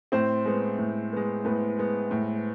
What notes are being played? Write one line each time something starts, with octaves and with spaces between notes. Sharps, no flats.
A2 C4 C5
G#3 B3
A2
G#3 B3
A2 B3 B4
G#3 B3
A2